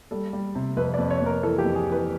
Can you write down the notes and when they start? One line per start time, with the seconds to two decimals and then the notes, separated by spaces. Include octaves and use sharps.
0.11 G3 A4
0.33 G3
0.55 C3
0.77 F2 B4
0.94 F2 D5
1.10 C#5
1.21 F2 A#4
1.43 E3 A4
1.59 G4
1.65 F2
1.75 G#4
1.87 E3 B4